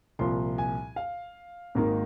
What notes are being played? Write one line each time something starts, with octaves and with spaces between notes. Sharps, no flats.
C2 A#2 F3 C6
G#5
F5
G#1 G#2 D#3 A#3 D#4